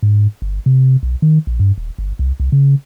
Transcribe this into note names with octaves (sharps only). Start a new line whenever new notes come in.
G#2
G1
C3
B1
D#3
A#1
G2
D#1
G1
C2
C2
C#3